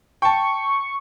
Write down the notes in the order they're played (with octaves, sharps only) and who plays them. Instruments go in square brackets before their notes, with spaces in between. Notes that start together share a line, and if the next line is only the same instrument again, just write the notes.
[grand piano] G5 A5 [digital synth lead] C#6